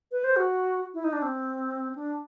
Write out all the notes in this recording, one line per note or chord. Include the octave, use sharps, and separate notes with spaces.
B4
C5
F#4
E4
D#4
D4
C4
D4